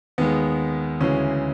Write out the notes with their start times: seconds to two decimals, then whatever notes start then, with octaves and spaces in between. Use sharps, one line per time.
0.18 D#2 D#3 G#3 B3
1.00 D2 C#3 E3 G#3 C#4